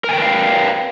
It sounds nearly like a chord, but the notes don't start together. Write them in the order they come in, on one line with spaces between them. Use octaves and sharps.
A#4 G#5 G5 B4 F5